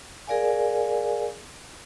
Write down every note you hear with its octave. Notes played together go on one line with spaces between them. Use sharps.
G#4 A#4 D5 F5 G#5